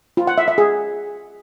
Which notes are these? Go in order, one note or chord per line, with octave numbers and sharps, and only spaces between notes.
F4
F#5
E5
E5
G#4